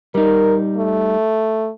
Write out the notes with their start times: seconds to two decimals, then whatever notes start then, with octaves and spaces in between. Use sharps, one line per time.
0.15 G3 D#4 A#4
0.77 A3